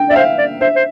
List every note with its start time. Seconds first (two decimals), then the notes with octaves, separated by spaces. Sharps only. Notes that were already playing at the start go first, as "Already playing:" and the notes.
Already playing: G5
0.09 D5 E5
0.16 C5 F5
0.38 D5
0.61 C5 E5
0.76 C5